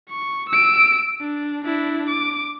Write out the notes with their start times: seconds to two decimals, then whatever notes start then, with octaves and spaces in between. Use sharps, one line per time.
0.11 C#6
0.50 E6 D7
1.21 D4
1.65 D4 E4
2.09 D6